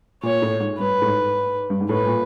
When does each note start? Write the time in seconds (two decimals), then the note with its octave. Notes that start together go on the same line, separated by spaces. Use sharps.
0.23 A#2 C#5
0.42 A2
0.60 G#2
0.79 G2 B4
1.02 A2
1.06 G#2
1.70 G2
1.80 G#2
1.89 A2 B4
2.06 A#2